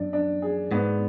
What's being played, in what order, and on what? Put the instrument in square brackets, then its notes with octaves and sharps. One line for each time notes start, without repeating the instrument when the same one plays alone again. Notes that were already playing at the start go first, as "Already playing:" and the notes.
Already playing: [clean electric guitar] F#2 [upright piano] D4
[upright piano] D4
G#4
[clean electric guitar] G#2 [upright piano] B3